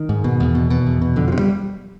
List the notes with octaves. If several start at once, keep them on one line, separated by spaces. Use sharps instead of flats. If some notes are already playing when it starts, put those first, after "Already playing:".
Already playing: D#3
G#2
B2
E2
B2
B2
E2
B2
F2 D3
F3
C3
G3